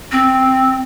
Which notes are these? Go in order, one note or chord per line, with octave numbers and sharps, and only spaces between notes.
C4